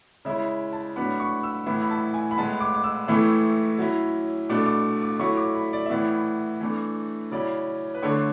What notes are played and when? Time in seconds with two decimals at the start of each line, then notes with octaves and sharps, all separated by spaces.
0.25 C#3 G#3 C#4 E4 E5
0.73 A5
0.96 A2 F#3 B3 D4 B5
1.20 C#6
1.43 E6
1.66 A2 E3 B3 E4
1.80 B5
1.91 A5
2.14 G#5
2.31 B5
2.38 A2 G#3 B3 A5
2.61 D6
2.74 D6
2.84 E6
3.08 A2 E3 A3 E4
3.78 F#3 C#4 E4
4.49 B2 A3 D4 D6
4.66 D6
5.02 D6
5.19 F#3 A3 E4 C#6
5.37 D6
5.55 B5
5.73 D5
5.86 E5
5.90 A2 E3 B3 E4 D5
6.60 E3 A3 D4
7.31 C#3 F#3 C#4 E4 D5
7.94 B4
8.02 D3 A3 D4 C#5